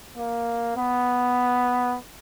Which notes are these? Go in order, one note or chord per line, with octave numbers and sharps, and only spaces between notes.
A#3
B3